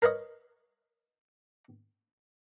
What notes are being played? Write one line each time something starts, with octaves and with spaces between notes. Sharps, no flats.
A#4 B4 C#5 D#5